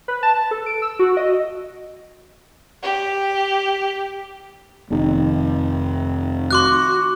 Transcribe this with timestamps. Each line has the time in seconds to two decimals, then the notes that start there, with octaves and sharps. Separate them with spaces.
0.08 B4
0.23 A5
0.51 A4
0.66 D7
0.82 E6
0.99 F#4
1.17 D#5
2.83 G4
4.90 F1 F2 D#3 D#4
6.51 F#4 C6 D6 F#6